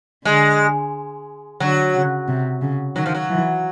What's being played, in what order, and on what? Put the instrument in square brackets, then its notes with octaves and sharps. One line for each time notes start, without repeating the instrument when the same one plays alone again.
[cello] D3 [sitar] G#3
[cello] D3 [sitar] F#3
[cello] C#3
C3
C#3
[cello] D#3 [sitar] F#3
[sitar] F3
F#3
[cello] E3